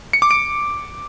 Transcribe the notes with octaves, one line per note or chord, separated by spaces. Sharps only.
C#7
D6
D7